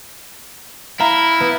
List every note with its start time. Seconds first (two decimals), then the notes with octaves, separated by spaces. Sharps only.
1.00 E4 F5 A#5
1.41 B3